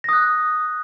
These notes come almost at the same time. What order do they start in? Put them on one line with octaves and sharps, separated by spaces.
A#6 D#6 F#6